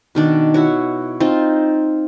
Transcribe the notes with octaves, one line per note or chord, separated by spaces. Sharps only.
B2 D#3 D4
E4 F#4 C#5
C4 D#4 F4